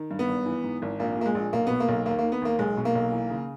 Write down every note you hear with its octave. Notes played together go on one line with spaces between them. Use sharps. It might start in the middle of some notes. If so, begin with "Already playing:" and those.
Already playing: D#3
G2
B3
G#1
E3
G#2
G#1
A#1 A#3
A#2 A#3
G#3
A#1
B1 A#3
B2 B3
A#3
B1
D#2 A#3
A#3
D#3
B3
D#2 A#3
B1 G#3
B2
A#3
B1
E3
C#3